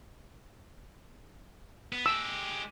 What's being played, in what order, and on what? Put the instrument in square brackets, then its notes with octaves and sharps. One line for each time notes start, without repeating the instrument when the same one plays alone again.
[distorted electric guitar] B3
[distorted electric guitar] G#3 G4 [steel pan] E6